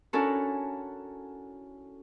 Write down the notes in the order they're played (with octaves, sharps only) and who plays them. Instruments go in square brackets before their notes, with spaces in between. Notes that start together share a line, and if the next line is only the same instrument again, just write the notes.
[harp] C#4 D4 E4 F#4 A4 A#4